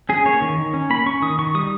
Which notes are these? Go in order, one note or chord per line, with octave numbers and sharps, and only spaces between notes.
C#4 G#4
A#3 C#5
D#3
D#3
C#4
A#3 B5
C#4 C#6
D#3 D#6
D#3 C#6
G3 D#6